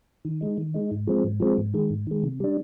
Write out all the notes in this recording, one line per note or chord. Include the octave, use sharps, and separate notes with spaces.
D#3
G#3 D#4
D#3
G#3 D#4
G#2
F3 G#3 C4
G#2
F3 G#3 C4
G#2
D#3 G#3
G#2
D#3 G#3
C3
G3 D4